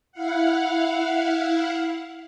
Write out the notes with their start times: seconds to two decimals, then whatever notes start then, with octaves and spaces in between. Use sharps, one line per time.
0.12 E4 F5 F#5